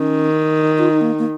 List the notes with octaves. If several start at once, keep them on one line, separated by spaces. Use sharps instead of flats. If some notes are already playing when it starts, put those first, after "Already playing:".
Already playing: D#3 C#4
F4
D#4
A#3
A#3